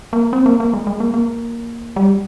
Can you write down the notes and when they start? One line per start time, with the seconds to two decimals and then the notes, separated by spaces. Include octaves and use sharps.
0.13 A#3
0.33 C4
0.46 A#3
0.60 A#3
0.73 G#3
0.87 G#3
1.00 A#3
1.14 A#3
1.96 G3